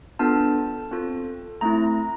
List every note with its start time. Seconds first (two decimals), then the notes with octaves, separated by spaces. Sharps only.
0.19 B3 D4 F4 A4 A5
0.91 C4 F4 A4
1.61 A3 C4 E4 A#5